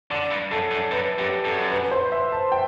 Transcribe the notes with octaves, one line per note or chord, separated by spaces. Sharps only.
D3 D5
G2
F#2 A4
F#2 A4
F#2 B4
F#2 G4
F#2 A4
B4
C5
E5
A5
G5